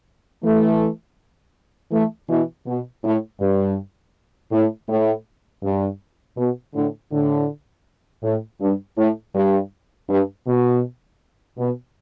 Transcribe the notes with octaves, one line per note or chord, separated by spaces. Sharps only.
E3 A3
E3 A3
B2 E3
B2
A2
G2
A2
A2
G2
B2
A2 D3
A2 D3
A2
G2
A2
G2
G2
B2
B2